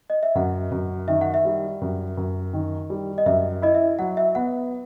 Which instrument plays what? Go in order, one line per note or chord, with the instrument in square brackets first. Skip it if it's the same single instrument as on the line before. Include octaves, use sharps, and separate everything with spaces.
[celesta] D#5
E5
[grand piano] F#2 [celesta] F#5
[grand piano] F#2
[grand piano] D#3 [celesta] E5
[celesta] F#5
E5
[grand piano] G3
F#2
F#2
D#3
G3
[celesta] D#5
[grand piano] F#2 [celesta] E5
[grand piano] E4 [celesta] D#5
[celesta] E5
[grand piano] F#3 [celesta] F#5
[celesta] E5
[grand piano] B3 [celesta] F#5